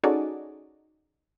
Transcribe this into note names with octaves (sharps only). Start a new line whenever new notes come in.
C#4 D#4 F#4 G#4 A4 D5